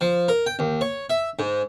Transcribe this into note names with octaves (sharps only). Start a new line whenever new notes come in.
F3
A#4
G5
D#2
C#5
E5
G#2